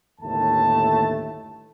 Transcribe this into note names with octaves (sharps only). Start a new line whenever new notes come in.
G1 D#2 A2 D#3 A3 A5